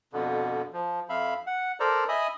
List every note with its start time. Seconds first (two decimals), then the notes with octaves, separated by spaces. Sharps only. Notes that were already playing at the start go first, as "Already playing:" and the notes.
0.13 F2 B2 D3
0.73 F3
1.09 F2 E5 F5 B5
1.47 F#5
1.80 A4 A#4 C5 D5 A#5
2.09 D#5 E5 G#5 B5 D#6